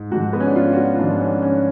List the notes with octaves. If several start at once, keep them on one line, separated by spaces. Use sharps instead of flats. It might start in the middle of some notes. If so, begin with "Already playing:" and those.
Already playing: G#2
G#2 F3 F#4
B3
C#4
D4
F4
F#4
F4
G#2 F3 D4
C#4
C#4